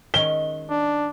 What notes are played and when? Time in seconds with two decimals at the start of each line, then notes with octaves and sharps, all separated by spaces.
0.14 D#3 G#3 C#4 G7
0.70 D4